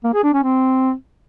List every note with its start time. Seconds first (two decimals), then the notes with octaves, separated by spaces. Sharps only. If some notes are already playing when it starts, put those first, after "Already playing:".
0.04 A#3
0.14 G#4
0.24 D4
0.34 C#4
0.43 C4